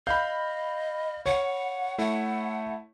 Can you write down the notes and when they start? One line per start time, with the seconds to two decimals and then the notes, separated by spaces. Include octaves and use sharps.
0.07 D#5 F5 B5 G6
1.26 C#5 F#5
1.98 A3 E4 F#5